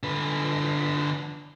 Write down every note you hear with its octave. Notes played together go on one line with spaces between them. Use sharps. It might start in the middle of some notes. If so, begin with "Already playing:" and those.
D3 B4